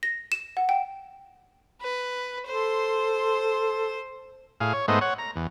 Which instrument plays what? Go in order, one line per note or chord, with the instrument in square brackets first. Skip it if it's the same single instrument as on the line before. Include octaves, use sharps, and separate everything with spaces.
[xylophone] A#6
E7
F#5
G5
[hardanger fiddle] B4
[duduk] A4 [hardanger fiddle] C5 C6
[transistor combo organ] A2 G#4 F5
C#5
G#2 A3 B3 C5 D#5
C#5 F#5
A#5
E2